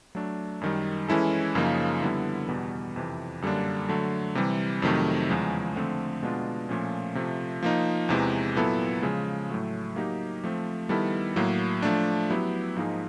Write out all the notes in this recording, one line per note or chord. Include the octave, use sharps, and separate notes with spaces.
F#3 A3 D4
F#2 D#3 G3
E3 G#3 C#4 E4 A4
F#2 C#3 F3 A#3 D#4
D3 G3 B3 E4
E2 B2 G3
F2 C3 E3
F#2 D3 G3 A#3 D4
D3 F#3 A3
C3 E3 G3
F2 C3 D#3 F#3 A3
E2 C#3 F3 G#3
D3 F3 A3 C4
B2 G#3 B3 D4 F4
A#2 F3 A3 C#4
C3 F3 A3
F3 A#3 D#4
E2 C3 E3 G#3
A#2 F#3 B3 E4 A4
C#3 F3 G#3
A2 F#3 A3
F#3 A#3 D#4 G4
F3 A3 C4
D#3 G3 B3 E4 A4
A2 F#3 A#3
F3 A3 D4
F#3 B3 E4 G4
G#2 F3 A#3 D#4 G#4